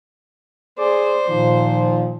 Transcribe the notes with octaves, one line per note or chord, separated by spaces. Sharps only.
G#4 C5 D5
A#2 D#3 F3